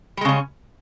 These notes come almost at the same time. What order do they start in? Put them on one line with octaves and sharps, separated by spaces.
G3 G#3 C#3 C#4